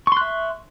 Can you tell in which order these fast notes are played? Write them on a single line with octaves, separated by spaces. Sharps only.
C#6 C6 F#6 E5